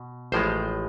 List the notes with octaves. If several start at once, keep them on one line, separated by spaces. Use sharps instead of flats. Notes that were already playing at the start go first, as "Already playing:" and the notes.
Already playing: B2
A1 A2 F3 G#3 C5